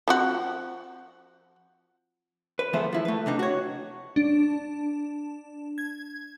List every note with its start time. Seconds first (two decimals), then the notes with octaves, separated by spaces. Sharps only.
0.08 F3 C4 F#4
2.59 B4
2.73 E2 F3 A3 B3 C5 E5
2.93 F3 E4
3.05 A3 B4
3.26 C3 D4 D#4
3.39 F#4 C#5
4.16 D4
5.78 G#6